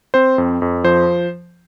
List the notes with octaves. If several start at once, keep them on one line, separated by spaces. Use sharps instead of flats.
C4 C5
F2
F2
F3 C5